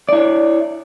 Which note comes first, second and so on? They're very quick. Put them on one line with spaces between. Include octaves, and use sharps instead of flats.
D5 E4 C#5